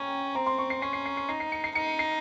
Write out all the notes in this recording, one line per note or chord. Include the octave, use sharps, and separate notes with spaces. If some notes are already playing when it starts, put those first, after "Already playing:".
Already playing: C#4 G5 A#5
C4 A#5
C6
C#6
C7
C#4 C7
C7
C7
C7
D#4 C7
C7
C#7
C7
D#4 C#7
C7